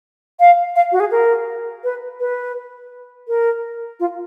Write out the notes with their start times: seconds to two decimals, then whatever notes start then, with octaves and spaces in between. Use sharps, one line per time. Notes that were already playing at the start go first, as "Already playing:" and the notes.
0.40 F5
0.76 F5
0.92 F#4
1.00 G#4
1.11 A#4
1.84 B4
2.20 B4
3.28 A#4
4.00 F4